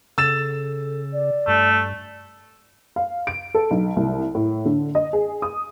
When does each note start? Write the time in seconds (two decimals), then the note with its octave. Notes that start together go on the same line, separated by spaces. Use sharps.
0.18 C#3 A4 E6 A6 E7
1.12 D5
1.48 G2 A3
2.96 F5
3.27 D7
3.55 A4
3.71 B1
3.96 C2
4.35 A2
4.65 D3
4.95 D#5
5.13 G#4
5.42 D#6